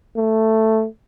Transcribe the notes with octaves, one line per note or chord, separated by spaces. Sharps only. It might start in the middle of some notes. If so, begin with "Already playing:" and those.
A3